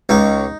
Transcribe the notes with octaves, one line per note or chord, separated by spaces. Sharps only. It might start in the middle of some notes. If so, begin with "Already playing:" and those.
C#2 D#4